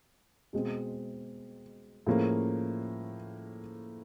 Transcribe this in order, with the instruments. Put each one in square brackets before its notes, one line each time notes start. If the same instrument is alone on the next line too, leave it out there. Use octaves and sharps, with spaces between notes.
[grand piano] B2 G#3 C4 G#4
A2 F3 A#3 C#4 G#4